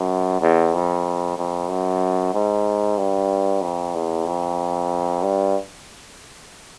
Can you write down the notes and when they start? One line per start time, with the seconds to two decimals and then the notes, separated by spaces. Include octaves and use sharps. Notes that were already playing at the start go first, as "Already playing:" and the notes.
Already playing: F#2
0.41 E2
0.74 F2
1.38 F2
1.69 F#2
2.34 G#2
2.98 G2
3.62 F2
3.95 E2
4.26 F2
5.23 G2